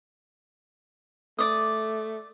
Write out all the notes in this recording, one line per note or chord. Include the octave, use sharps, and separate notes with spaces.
A3 D5 D#6